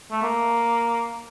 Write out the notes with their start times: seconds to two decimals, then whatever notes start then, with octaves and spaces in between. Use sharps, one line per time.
0.11 A3
0.22 A#3